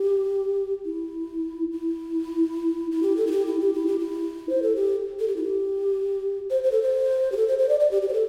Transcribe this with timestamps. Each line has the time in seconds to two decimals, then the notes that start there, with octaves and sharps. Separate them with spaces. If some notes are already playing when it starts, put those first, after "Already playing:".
Already playing: G4
0.85 E4
1.72 E4
2.91 E4
3.02 G4
3.17 A4
3.27 E4
3.32 G4
3.46 E4
3.60 G4
3.73 E4
3.87 G4
3.99 E4
4.49 C5
4.63 A4
4.76 G4
5.20 A4
5.28 G4
5.36 E4
5.43 G4
6.50 C5
6.64 C5
6.72 A4
6.82 C5
7.32 G4
7.37 A4
7.48 C5
7.59 C5
7.69 D5
7.80 D5
7.91 G4
8.02 G4
8.08 C5
8.13 A4